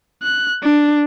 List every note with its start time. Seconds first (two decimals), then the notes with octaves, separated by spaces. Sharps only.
0.22 F#6
0.63 D4